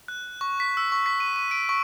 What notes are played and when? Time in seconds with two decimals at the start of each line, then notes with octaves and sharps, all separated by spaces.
0.08 F#6
0.41 C#6
0.60 B6
0.77 E6
0.92 C#6
1.06 B6
1.20 D#7
1.36 D#7
1.51 D7
1.69 C#6